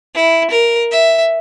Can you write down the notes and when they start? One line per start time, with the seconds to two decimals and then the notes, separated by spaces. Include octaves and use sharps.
0.15 E4
0.51 A#4
0.91 E5